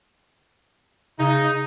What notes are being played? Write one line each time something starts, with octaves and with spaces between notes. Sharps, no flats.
C#3 D#4